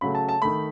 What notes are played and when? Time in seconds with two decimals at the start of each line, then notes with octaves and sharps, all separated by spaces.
0.01 C#3 F#3 A3 B5
0.15 A5
0.29 A5
0.42 D#3 A3 B5